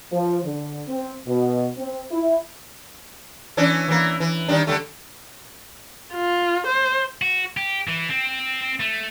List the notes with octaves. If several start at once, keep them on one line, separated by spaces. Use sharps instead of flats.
F3
D3
C4
B2
C4
E4
E3 C#4 D4
E3 A#3
E3
D#3 G3 D4
D3 G3 A3
F4
C5
F#4
G4
E3
C4
A3